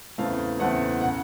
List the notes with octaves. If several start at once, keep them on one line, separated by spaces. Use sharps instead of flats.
E2 C#3 E3 A3 C4 F5
E2 C#3 E3 A3 C4 F#5
F#5
C#3